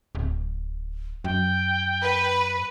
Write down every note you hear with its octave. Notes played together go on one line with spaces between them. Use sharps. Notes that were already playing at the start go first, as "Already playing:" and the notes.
D1
F#2 G5
B4